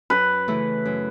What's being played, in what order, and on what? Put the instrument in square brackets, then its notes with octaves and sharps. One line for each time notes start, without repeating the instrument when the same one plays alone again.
[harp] F#2 [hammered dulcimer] B4
[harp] C#3 E3 A3 E4
F#2